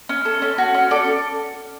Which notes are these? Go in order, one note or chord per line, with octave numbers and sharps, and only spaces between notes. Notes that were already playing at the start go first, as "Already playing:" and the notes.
C#4
A4
C#4
F#4
C#4
A4 D5